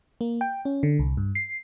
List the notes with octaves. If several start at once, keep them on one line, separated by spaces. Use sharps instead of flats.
A#3
G5
C#4
D3
C2
G2
C7